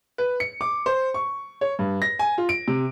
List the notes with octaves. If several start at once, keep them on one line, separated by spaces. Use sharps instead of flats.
B4
C#7
D6
C5
C#6
C#5
G2
A#6
G#5
F4
D7
C3